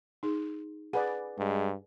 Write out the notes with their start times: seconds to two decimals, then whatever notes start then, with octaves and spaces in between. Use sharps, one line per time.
0.23 D#4 G#4
0.93 G#4 B4 D5 F#5
1.38 G2 G#3